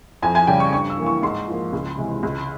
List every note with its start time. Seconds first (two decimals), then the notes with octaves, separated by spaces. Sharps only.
0.22 F2 G#5
0.35 G#5
0.47 C#3 G3 G5
0.60 C#6
0.73 G2 C#6
0.90 E6
0.98 E3 A#3
1.06 C#6
1.22 G#2 C6
1.48 F3 A#3
1.73 C#2
1.97 C3 E3 G#3
2.23 C#2